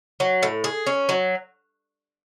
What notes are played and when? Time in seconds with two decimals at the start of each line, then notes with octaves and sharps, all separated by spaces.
0.20 F#3
0.43 A2
0.64 G#4
0.87 C#4
1.09 F#3